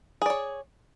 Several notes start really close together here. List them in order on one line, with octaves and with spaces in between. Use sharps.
G#4 D5 C#5